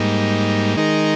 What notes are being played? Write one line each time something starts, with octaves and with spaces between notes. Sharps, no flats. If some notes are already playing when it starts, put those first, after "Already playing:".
Already playing: G#2 G3 A#3 D#4
D#3 G#3 D#4 A#4